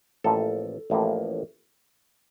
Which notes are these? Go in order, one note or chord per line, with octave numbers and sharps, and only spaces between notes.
A1 A2 F3 A#3 A4
A1 A2 F3 A#3